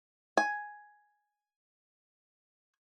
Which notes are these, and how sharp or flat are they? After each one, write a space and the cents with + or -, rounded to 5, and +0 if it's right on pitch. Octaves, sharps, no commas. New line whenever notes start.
G#5 +5